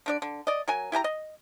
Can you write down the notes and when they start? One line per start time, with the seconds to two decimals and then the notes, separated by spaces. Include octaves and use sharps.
0.06 D3 D4 D5
0.22 D3
0.47 D5 D#5
0.68 F#3 A#4 G#5
0.92 E4 G4 G#5 A#5
1.04 D#5